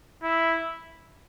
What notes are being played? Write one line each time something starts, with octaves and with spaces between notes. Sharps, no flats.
E4